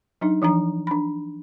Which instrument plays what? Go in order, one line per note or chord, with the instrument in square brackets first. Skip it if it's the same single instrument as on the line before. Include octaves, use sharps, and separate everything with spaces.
[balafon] F#3 D4 D#4
E3 F3 D4 A#5
D4 B5